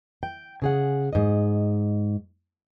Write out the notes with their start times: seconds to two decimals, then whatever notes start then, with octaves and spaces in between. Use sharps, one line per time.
0.23 G5
0.62 C#3 G#4 F#5
1.13 G#2 D#5